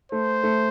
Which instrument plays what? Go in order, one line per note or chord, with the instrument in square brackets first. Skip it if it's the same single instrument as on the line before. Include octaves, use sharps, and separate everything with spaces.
[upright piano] A3 [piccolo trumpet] C5
[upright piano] A3